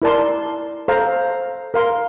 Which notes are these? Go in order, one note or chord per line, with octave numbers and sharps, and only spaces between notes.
E4 A#4 D5 A5 C6
A4 C5 F5 A#5
A#4 F5 C6